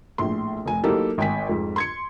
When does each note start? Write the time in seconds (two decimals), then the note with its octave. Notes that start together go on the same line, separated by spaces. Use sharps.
0.18 A#1 A2 C6
0.66 F1 G#5
0.84 F#3 A#3 D#4 E4 G4 A4
1.18 G#1 G5 G#5 B6
1.49 F2 G#2
1.76 C6 G#6 C#7